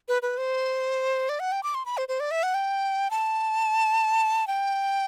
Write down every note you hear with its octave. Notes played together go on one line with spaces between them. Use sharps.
B4
B4
C5
D5
F#5
G5
D6
C6
B5
C5
C5
D5
E5
F#5
G5
A5
G5